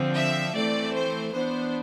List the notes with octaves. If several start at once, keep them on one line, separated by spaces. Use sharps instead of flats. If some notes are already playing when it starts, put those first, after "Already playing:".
Already playing: D3 F3 C4
E5
E3 A3 C4 D5
C5
E3 B3 D4 C5